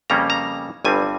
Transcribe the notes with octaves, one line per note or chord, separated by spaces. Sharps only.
F2 C#3 G3 A#3 C#4 A#5
A#5
G1 G2 G3 C4 G#5